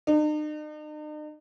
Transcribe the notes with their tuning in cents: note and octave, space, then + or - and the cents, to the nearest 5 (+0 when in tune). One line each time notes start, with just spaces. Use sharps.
D#4 -45